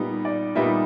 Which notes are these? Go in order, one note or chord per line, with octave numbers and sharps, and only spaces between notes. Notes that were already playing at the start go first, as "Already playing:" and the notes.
Already playing: A#2 G3 B3 D#4
D5
A#2 G3 B3 D#4 E5